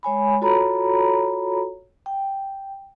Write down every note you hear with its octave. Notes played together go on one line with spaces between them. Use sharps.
G#3 C#5 G#5 B5
F4 F#4 A4 C#5 A#5 B5
G5